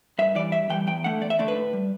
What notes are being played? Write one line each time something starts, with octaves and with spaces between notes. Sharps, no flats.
G2 E5
E3 G3 D5
G2 E5
E3 G3 G5
E2 G5
D3 A3 F#5
E2 D5
E5
D3 A3 D5
B4
A2
G3